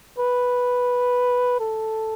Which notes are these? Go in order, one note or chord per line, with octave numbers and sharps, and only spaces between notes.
B4
A4